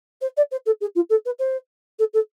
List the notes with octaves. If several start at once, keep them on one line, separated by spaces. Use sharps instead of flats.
C5
D5
C5
A4
G#4
F4
A4
B4
C5
A4
A4